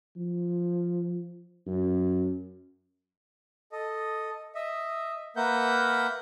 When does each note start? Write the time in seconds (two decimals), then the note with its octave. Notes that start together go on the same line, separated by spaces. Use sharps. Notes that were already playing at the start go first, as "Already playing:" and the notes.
0.17 F3
1.67 F#2
3.72 A4 D#5
4.55 D#5 E5
5.36 A#3 A#4 B4 E5 F#5 G6